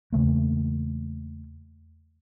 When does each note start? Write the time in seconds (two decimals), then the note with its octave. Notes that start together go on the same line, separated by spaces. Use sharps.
0.13 E2 C#3 A3 A#3